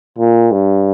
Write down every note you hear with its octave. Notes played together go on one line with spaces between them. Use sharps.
A#2
G2